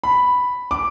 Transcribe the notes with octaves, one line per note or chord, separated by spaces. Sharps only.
B5
D6